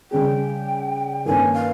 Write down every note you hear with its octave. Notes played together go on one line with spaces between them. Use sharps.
C#3 G3 C#4 G#4 G5
G2 D#3 A#3 C#4 G#5
F5